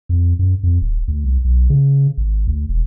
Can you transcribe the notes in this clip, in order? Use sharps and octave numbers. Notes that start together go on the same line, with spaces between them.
F2
F#2
F2
D1
D2
C2
B1
C#3
G#1
D2
E1